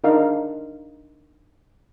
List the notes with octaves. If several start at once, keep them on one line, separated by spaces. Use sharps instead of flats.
D4 D#4 A#4 F5